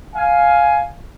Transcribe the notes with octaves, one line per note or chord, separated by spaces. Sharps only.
F5 G#5